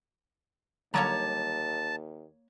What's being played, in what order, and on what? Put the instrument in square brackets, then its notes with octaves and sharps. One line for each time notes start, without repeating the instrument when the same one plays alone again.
[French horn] D#2 [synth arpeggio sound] D3 F#3 G3 [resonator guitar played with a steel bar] A#3 C#5 A#5 [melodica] A5